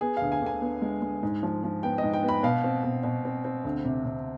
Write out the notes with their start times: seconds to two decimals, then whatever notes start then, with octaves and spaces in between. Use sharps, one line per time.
0.01 B3 G#4
0.17 D2 F5
0.32 G#5
0.42 D3 G#5
0.62 B3
0.82 G#3
1.02 G#3
1.23 G#2
1.43 F3
1.64 F3
1.83 B3 G5
1.98 D#5
2.03 G#2
2.13 G5
2.23 B3
2.28 B5
2.43 B2 F5
2.64 C4
2.84 B2
3.04 B2
3.25 C4
3.44 C4
3.65 D2
3.85 C3
4.05 C3